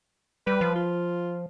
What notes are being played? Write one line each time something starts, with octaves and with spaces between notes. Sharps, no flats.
G3 B4
F3
F4